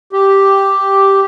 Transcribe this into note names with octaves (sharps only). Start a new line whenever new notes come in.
G4